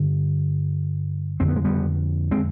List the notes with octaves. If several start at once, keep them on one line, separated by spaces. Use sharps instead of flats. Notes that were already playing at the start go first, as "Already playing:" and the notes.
Already playing: G2 D3
F2 D3 C4
B3
G#3
G3 B3
G#3 C4